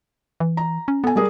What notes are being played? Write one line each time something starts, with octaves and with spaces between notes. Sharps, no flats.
E3
A#5
C#4
B3 A4 G#5
G3 G#4 A#4